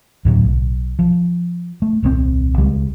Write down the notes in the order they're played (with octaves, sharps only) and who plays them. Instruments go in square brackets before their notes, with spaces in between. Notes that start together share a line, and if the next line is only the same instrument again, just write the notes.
[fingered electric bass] D2 A2 D3 F#3
B1
F3
A3
D#1 C2 C#3 C4
C#2 G3 G#3